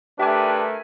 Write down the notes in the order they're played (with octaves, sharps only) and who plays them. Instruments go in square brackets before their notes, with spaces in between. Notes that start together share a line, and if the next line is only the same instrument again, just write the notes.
[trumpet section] A3 A#4 B4 [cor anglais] D4 [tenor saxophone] G4 [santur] E5 G#5